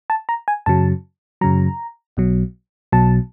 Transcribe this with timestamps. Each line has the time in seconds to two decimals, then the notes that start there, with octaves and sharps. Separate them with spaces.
0.10 A5
0.29 A#5
0.48 G#5
0.66 F#2 C#3 F#3 A5
1.41 F#2 C#3 F#3 A#5
2.17 B1 B2 F#3
2.92 B1 B2 F#3 A5